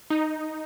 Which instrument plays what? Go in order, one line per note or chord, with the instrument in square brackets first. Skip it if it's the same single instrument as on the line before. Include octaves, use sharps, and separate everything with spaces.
[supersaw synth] D#4